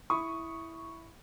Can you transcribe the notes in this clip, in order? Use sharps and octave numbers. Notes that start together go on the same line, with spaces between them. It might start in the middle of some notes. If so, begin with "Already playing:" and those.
E4 B5 C#6 D#6